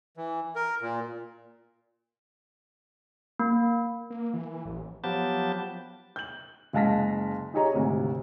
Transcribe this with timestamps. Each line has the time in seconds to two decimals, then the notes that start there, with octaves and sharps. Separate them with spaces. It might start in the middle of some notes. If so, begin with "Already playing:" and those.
0.17 E3
0.56 A#4
0.82 A#2
3.39 A#3
4.10 A#3
4.34 E3
4.65 A1
5.04 F3 F#3 B3 G4 A5
6.16 G6 F#7
6.73 F#1 G#3 F5 A5 A#6 B6
7.54 D#4 G4 G#4 C#5 D#5 A#5
7.73 G#1 D2 C3